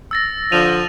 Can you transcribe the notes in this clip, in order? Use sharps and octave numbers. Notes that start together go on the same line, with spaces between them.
E6 A6 A#6
D3 F3 D#7 F7